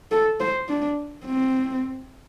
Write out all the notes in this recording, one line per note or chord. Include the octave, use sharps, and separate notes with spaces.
A4
C5
D4
C4